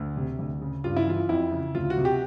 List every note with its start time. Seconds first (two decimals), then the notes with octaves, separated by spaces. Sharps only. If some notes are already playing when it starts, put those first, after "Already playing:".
Already playing: D2
0.17 C3
0.39 D2
0.61 C#3
0.84 G2 F4
0.96 E4
1.07 E3 F4
1.29 F2 E4
1.52 C#3
1.75 D2 F4
1.90 F#4
1.97 C3
2.05 G4